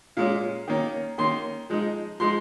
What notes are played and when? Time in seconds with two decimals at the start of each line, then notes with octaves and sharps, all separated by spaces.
0.17 A#2 G#3 C#4 F5
0.68 D#3 A#3 C#4
1.18 D#3 A#3 C#4 C6
1.70 F3 G#3 D#4
2.20 F3 G#3 D#4 C6